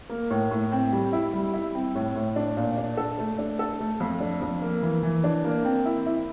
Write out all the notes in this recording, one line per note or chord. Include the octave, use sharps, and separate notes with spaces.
A#3
A2
A2
C4
G3
E4
G3
E4
C4
A2
A2
D4
A#2
D4
A4
A3
D4
A4
A3
F2
D4
F2
A#3
E3
E3
D4
A#3
C4
E4
E4